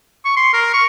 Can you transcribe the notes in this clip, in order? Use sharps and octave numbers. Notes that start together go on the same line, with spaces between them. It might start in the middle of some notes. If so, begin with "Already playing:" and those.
C#6
C6
A#4
C#6